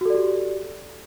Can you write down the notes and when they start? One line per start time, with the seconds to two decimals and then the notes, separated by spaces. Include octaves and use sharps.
0.01 F#4
0.05 A4
0.10 D5
0.15 G4